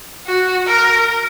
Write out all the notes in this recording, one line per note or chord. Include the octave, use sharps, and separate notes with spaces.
F#4
A#4